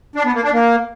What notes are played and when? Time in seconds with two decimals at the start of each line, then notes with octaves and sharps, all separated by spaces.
0.16 D4
0.25 B3
0.34 A#3
0.44 D4
0.53 A#3